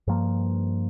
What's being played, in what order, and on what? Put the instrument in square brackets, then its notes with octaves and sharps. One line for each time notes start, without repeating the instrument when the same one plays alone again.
[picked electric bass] G2 F3 A#3